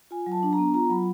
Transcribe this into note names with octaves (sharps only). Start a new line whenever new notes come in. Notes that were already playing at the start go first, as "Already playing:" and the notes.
F4 G#5
F#3
A5
D4
A#5
B3
F4 A#5
F#3 B5